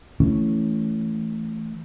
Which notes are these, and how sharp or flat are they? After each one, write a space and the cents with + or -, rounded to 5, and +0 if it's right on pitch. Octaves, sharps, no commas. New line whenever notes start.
E3 +0 A3 +0 C#4 +0